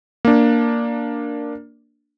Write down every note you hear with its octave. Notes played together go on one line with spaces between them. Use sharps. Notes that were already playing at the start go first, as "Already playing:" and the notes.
A#3 D4